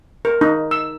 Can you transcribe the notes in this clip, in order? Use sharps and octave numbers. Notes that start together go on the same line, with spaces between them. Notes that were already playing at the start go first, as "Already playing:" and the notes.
A#4
D#4
E6